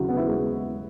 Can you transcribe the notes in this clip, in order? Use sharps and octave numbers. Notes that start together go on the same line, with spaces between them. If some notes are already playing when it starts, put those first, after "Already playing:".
Already playing: D#2 C#3 F#3 E4 F#4
B3
E4
G#3